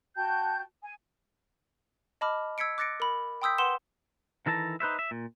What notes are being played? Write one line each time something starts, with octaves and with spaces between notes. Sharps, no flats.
F#4 G5 A5 G6
G#5
D#5 A5 B5 D6 F6
E6 G#6 B6 C#7 D7
D6 F#6 A6 A#6 C#7 D7
A#4 B5
G5 C6 D#6 E6 G6 B6
B4 F#5 C6 E7 G7
D#3 E3 A4 A5 A#5
D#4 B4 C5 E5
E5
A#2